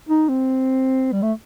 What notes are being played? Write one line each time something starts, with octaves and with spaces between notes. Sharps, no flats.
D#4
C4
G3
A3